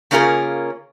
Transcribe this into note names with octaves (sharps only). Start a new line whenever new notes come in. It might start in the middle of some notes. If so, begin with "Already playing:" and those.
C#3 A#3 C#4 F4 G#4 A#4